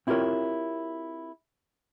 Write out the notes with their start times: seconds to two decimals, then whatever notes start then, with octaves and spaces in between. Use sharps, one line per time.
0.07 C4 E4 F4 G4 A#4 C#5